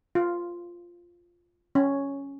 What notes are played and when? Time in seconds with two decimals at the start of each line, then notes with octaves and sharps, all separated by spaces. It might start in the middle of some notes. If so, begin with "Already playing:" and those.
0.15 F4
1.75 C#4